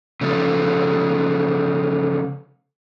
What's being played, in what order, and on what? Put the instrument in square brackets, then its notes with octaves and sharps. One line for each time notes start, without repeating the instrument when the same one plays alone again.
[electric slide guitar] C#3 F3 A3